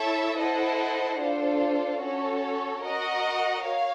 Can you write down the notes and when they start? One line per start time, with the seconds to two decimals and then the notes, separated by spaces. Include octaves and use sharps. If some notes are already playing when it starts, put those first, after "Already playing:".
Already playing: E4 A4 C#5 E5 A5
0.38 E4 A4 C5 D#5 F#5
1.19 D4 F4 A4 C5
2.01 C#4 F#4 A4 C#5
2.82 F#4 A#4 D#5 F#5
3.64 C#5 F5